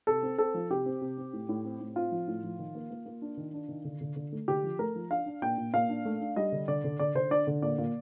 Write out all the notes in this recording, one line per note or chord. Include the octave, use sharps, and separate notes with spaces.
C3 A4
C4
C4 A4
F3
C3 G4
C4
C3
C4
A2
A2
C4
A2
C4 F4
F3
A2
F3
D#3
A#3
A#3
A#3
D4
D#3
D4
D#3
D3
D3
D3
A3
D3 G4
F3
A3 A#4
F3
D4 F5
D4
A#2 G5
A#2
A#2 F5
D4
A3
D4
G3 D#5
D3
D3 D5
D3
D3 D5
D3 C5
D4 D5
D3
A#2 D5
A#2